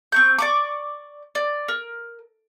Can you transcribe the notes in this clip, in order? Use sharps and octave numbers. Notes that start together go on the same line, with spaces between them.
C4 C#6 G6
D5 C#6 D6
D5
A#4